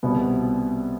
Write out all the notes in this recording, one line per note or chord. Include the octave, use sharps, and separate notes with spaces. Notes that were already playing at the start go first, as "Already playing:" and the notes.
C2 B2 G3 B3